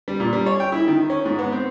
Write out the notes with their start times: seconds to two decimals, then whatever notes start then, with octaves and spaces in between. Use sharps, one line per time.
0.08 G3
0.20 A#2
0.33 G3
0.46 C#5
0.60 G5
0.72 E4
0.88 D#3
1.10 C#4
1.25 G#2
1.39 B3
1.52 C4